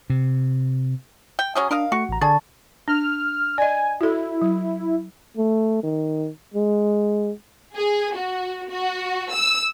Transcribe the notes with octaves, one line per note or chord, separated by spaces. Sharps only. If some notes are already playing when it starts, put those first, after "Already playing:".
C3
G5
F#3 C#4 G#4
D4 A#4 D#5 F5
A3 F#4 C#6 C#7
A1 A#5
D3 G#4 D5 A5 C#6 A6
D4 F6
D5 D#5 G#5
E4 F#4 A4
F#3
A3
D#3
G#3
G#4
F#4
F#4
E6